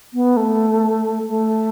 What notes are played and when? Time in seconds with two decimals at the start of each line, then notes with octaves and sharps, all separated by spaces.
0.14 B3
0.37 A3
1.29 A3